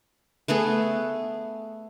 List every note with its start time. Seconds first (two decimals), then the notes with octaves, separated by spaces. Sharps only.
0.48 A3 B3 G#4 A4